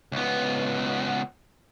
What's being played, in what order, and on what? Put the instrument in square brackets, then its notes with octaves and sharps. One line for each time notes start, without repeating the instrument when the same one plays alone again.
[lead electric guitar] C#2 B3